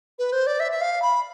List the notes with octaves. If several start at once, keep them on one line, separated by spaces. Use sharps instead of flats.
B4
C5
D5
E5
E5
F5
B5